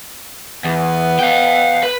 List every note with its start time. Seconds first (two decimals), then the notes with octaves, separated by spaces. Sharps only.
0.64 E2 B3
1.19 F5 G5
1.83 B4